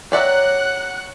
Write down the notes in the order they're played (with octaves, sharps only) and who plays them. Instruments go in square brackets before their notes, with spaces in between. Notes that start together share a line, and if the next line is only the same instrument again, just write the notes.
[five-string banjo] G4 D5 E5 [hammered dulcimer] C#5 A#5 [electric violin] F#5 F#6